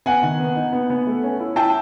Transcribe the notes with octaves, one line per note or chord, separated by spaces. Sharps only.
B3 F#5 G#5
D#3
B3
D#4
B3
B3
A3
C#4
E4
E4 G5 A5